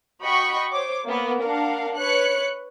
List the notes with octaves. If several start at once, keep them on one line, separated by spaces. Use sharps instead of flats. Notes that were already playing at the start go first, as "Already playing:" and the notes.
F#4 D#5 G5 B5 C#6
C5 C#5 D6
A#3 B3
D4 A#4 F5 F#5
B4 C#5 F#6 C#7